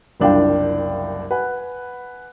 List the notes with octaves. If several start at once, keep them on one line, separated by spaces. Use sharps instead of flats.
F#1 C2 D4 F4 F5 G5
B4 F#5 G#5